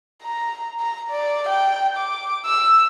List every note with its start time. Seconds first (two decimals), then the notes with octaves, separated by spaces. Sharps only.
0.24 A#5
0.80 A#5
1.11 D5
1.49 G5
1.97 D6
2.46 E6